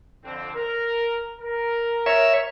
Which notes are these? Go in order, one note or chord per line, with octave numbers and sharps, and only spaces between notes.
F2 D3 C4
A#4
A#4
C#5 E5